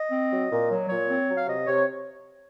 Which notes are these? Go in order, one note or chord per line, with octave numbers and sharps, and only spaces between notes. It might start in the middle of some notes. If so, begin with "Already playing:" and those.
Already playing: D#5
C4
F#3
A#2
F#3
A#2 C#5
C4
F#3
F5
C3 D#5
C3 C#5